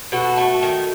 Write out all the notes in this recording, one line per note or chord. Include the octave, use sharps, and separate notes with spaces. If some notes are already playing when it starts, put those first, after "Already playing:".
B2 F#4 A4
A3
D#3